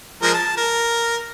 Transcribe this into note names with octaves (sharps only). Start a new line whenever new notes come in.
F3 G#3 A#4
A5
A#4